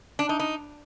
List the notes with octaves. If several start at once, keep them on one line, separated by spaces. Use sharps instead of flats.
D4
D#4
D#4